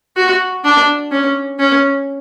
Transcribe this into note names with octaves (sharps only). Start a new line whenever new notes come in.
F#4
D4
C#4
C#4